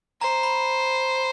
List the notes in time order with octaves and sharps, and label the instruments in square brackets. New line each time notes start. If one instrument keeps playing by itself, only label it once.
[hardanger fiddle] C5 [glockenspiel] A#5
[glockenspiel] B5